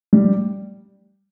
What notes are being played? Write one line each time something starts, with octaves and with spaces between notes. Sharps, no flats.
G3